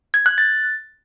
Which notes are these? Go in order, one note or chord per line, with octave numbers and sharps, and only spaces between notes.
G#6
F#6
A6